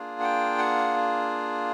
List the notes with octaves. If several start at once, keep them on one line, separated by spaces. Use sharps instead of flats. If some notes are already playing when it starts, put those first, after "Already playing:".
Already playing: A#3 D4 F4 G#4
F#5
G5
F#5